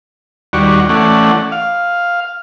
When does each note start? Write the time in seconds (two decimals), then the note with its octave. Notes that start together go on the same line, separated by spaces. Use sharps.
0.53 D#2 G3 F#4 D5 C#6
0.89 E3 A3 C#4 D5 F#5
1.52 F5